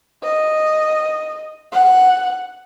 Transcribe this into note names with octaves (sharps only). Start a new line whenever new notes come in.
D#5
F#5